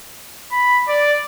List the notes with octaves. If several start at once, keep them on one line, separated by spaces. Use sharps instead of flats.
B5
D5